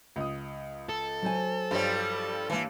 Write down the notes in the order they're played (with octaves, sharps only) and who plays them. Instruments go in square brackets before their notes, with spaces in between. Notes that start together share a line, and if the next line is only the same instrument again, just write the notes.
[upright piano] C#2 D#6
[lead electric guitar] A4
[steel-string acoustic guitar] F#3 C5 G#5
[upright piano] G2 C#5 [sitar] F3 G3
[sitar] E3 [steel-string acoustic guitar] A#3 A5